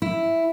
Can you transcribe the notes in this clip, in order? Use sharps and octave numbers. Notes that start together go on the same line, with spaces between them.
E4